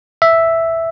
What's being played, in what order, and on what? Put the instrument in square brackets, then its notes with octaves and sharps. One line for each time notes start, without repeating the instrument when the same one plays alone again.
[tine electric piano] E5